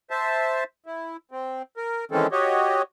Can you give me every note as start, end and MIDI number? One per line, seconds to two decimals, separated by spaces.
0.11 0.64 72
0.11 0.64 76
0.11 0.64 81
0.86 1.17 64
1.31 1.62 60
1.77 2.05 70
2.11 2.27 51
2.11 2.27 52
2.11 2.27 56
2.11 2.27 60
2.11 2.27 61
2.11 2.27 69
2.32 2.82 66
2.32 2.82 67
2.32 2.82 73
2.32 2.82 75